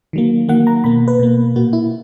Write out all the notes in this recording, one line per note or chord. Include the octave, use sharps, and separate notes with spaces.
D#3 F#3 A#3
D#3 F#3 A#3 F#5
A#5
B2 A#3 B5
B4
B2 A#3
A#2 A#3 F#4
E4